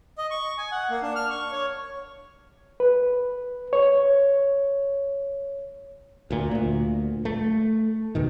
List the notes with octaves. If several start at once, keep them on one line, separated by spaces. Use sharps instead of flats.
D#5
C#6
G#5
F#5
A#3
D4
F6
C#6
C#5
B4
C#5
D2 A#2
D2 A#2
A3
D2 B2 D#3